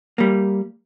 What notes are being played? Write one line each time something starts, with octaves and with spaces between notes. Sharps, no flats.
G3 A#3